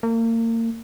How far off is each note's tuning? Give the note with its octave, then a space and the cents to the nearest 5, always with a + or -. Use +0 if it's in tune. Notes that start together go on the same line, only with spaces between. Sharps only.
A#3 -35